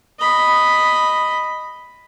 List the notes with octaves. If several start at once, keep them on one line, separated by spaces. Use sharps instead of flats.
D#5 B5